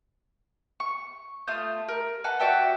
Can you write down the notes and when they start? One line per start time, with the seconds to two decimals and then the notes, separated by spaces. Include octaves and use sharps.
0.80 C#6
1.47 A3 F4 D#6 G6
1.88 A#4
2.24 B4 F#5 A5
2.39 F#4 D5 E5 G5